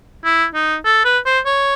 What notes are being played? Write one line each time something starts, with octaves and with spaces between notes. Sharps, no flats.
E4
D#4
A4
B4
C5
C#5